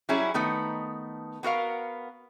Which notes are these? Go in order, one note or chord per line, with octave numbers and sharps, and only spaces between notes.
F#3 G3 C#4 E4 G#4
D#3 A3 B3 D#4
B3 F#4 A#4 F5